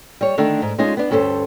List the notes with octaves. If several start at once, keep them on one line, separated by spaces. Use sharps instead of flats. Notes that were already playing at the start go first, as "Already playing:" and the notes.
G3 C#5
D3 D#3 A3 D4
G#2
G#3 C#4 D#4 F4 G#4
B3 D4
D2 G2 C#4 A4 C5